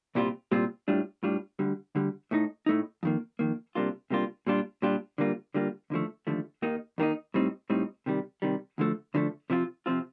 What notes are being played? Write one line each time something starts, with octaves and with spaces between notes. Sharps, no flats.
C2 A#2 G3 C4 F4
C2 A#2 G3 C4 F4
A2 G3 D4 F4
A2 G3 D4 F4
D2 D3 G3
D2 D3 G3
A2 A3 D#4
A2 A3 D#4
F2 D#3 A#3
F2 D#3 A#3
C3 G3 A#3 D4 F4
C3 G3 A#3 D4 F4
A#2 G3 D4 F4
A#2 G3 D4 F4
D3 G3 A#3 F4
D3 G3 A#3 F4
D#2 D3 F3 A3
D#2 D3 F3 A3
D#2 D#3 A#3 D#4
D#2 D#3 A#3 D#4
A2 G3 C4 D#4
A2 G3 C4 D#4
C3 D#3 G3
C3 D#3 G3
D2 D3 F3 A3
D2 D3 F3 A3
C3 F3 C4 F4
C3 F3 C4 F4